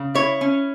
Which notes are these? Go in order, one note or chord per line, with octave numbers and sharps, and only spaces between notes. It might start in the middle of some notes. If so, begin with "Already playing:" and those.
Already playing: C#3
E4 C#5
C#4